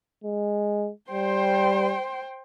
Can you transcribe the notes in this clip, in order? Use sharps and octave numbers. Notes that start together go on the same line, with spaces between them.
G#3
G3 C5 G5 C6